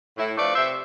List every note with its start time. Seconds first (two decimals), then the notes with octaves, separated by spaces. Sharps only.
0.17 A2 E4
0.37 F3 A3 D4 B4 D5
0.55 C3 C5 E5